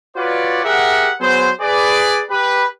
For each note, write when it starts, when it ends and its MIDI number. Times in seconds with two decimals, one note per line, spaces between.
0.17 0.61 65
0.17 0.61 66
0.17 0.61 71
0.17 0.61 73
0.17 0.61 74
0.64 1.11 67
0.64 1.11 68
0.64 1.11 70
0.64 1.11 76
0.64 1.11 78
1.20 1.50 54
1.20 1.50 59
1.20 1.50 68
1.20 1.50 72
1.61 2.22 68
1.61 2.22 71
1.61 2.22 74
2.30 2.65 67
2.30 2.65 71